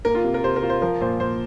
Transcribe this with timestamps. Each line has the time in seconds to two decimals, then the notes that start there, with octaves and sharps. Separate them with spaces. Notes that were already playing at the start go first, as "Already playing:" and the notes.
0.05 A#3 A#4
0.15 F4
0.24 C3
0.34 A#4
0.43 C3 C5
0.56 A#4
0.63 F4
0.70 C5
0.82 F3 A#4
1.01 A#2 C5
1.20 A#2 C5